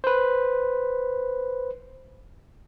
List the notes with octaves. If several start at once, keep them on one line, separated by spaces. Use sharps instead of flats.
B4 C5